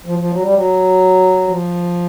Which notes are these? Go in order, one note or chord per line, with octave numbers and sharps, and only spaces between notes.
F3
F3
F#3
G3
F#3
F3